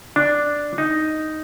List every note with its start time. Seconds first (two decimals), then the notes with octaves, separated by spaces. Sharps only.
0.16 D4
0.78 D#4